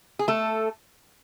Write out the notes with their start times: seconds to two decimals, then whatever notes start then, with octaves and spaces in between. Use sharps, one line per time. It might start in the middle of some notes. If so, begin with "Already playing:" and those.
0.19 G#4
0.28 A3 A4